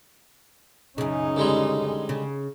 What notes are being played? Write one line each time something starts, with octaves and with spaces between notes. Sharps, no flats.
F#2 C#3 C#4 D#4
D3 G3 G#3
C#3